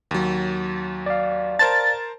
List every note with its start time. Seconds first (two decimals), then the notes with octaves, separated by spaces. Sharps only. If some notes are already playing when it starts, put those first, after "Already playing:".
0.11 D#2 F#3
1.06 D5 F5
1.59 A#4 C5 A5 A6